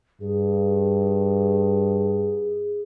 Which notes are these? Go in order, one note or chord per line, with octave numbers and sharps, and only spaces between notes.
G2 G#4